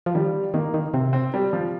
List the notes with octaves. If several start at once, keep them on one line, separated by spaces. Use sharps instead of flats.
F3
D#3 G3
D#3 A#3
D#3
C3 C4
C4
G3
F3